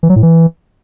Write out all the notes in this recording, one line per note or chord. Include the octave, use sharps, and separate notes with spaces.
E3
F#3
A2
E3